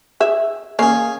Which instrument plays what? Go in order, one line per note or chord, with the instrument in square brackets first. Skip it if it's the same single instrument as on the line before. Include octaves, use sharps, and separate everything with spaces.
[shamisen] G#4 E5
[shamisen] A#3 F5 [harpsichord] C#4 G#4